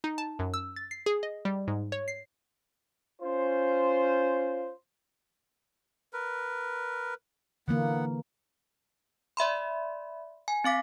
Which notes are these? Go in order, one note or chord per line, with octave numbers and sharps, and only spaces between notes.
D#4
A5
F#2
E6
A6
C7
G#4
D#5
G3
G#2
C#5
C7
C#4 F4 C5
A#4 B4
D3 E3 A#3 B3 F#5
D5 E5 B5 C6
G#5
C4 F5 D6 B6